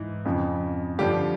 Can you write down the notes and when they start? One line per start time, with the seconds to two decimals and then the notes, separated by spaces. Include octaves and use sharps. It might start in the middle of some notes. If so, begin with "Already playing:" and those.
Already playing: G#2 E3
0.25 F2 C#3 F3
0.98 G2 D3 F3 G4